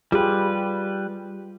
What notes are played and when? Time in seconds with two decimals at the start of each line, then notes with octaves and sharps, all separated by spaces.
0.12 G3 F4 G4 G#4 B4